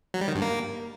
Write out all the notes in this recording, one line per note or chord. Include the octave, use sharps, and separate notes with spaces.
F#3
G3
D#3
G2
A#3